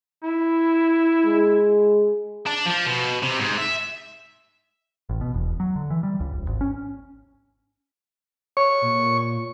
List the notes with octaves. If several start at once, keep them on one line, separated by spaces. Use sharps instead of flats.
E4
G#3
D4
F3
B2
C3
G#2
E5
A1
B2
E1
F#3
D3
E3
G3
C#2
D#1
G#1
C#4
C#5 C#6
A#2